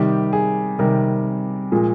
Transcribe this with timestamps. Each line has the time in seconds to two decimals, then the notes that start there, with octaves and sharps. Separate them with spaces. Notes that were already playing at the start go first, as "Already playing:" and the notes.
Already playing: C3 D#3 G3 G4
0.33 G#4
0.79 C3 D#3 G3 A#4
1.72 A#2 F3 G#3